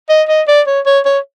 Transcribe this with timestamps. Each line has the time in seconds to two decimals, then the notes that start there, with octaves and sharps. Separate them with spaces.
0.09 D#5
0.29 D#5
0.48 D5
0.67 C#5
0.86 C#5
1.05 C#5